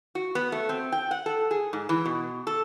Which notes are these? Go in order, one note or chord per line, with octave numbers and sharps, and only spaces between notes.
F#4
B3
A3
C4
G5
F#5
A4
G#4
G#2
E3
B2
A4